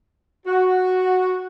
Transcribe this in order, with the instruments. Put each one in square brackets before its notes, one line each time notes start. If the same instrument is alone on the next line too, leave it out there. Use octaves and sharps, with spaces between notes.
[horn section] F#4